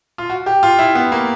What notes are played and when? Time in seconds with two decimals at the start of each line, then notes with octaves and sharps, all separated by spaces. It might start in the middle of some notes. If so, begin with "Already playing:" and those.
0.18 F4
0.30 F#4
0.46 G4
0.63 F4
0.79 E4
0.95 B3
1.12 A#3